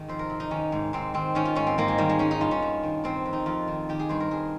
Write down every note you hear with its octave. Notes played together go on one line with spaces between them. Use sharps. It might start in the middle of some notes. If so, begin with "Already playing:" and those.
Already playing: G#2 D#3
F2 C5
A#4
C3
D#4
D#3 C#4
G#2
G#2 C4
D#3 C4
D#3 C#4
F4
G#2 C#4
C4
G#2 A#3
G#3
D#3 G3
G#3
D#3 C#4
D#4
G2 F4
C#4
G2
D#3
D#3 C4
F2
D#4
F2 F4
D#3
D#3 G4
G#4
G2 C5
A#4
G2 G#4